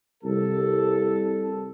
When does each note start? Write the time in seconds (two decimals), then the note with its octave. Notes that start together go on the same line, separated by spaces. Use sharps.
0.24 C2 A4